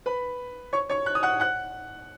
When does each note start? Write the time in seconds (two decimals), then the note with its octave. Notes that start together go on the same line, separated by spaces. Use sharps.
0.06 B4 B5
0.73 C#5 C#6
0.90 C#5 C#6
1.06 F#6
1.15 D#6
1.23 F#5 F#6
1.40 F#5 F#6